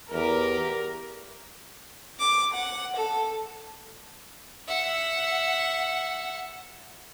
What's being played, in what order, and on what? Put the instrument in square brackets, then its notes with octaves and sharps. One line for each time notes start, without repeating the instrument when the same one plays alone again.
[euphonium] E2 [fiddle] G4 [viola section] A#4
[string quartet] D6
F#5
A4
[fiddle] E5 F#5